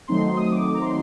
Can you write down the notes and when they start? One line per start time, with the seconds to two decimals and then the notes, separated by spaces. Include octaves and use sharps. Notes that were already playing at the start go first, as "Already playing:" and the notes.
0.08 D#3 F#3 A3 C4 D#4 C6
0.37 D#6
0.52 D6
0.67 D6
0.75 A#5
0.82 C6